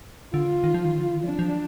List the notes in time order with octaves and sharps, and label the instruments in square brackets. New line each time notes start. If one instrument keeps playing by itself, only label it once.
[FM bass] D3 [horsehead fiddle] F4
[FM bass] D#3
F3
D#3
D3
D#3
[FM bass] F3 [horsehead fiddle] D4
[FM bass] F3